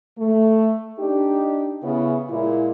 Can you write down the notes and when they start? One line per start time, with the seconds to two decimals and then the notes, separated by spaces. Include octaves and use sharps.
0.18 A3
0.99 D4 D#4 G4
1.83 C#3 B3 E4
2.29 A#2 G#3 A#3 E4